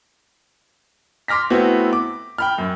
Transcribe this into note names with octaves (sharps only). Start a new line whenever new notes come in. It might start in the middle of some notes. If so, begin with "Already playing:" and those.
C6 D6 F6 A#6 B6
A3 B3 C4 E4 F#4
D6
G5 B5 F6
F#2